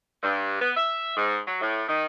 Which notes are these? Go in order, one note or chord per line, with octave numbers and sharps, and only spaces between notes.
G2
B3
E5
G#2
F#3
A2
D#3